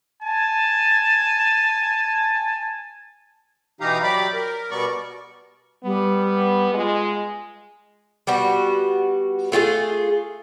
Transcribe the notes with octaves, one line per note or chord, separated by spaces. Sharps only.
G#5 A5
B2 E3 D#4 G4 F5 A#5
F#3 G4 D5 B5 D6
A#4
B2 G3 B3 D5 C#6
G3 B3
G#3 F4
G3 B3 F#4
A3 F4 F#4 G#4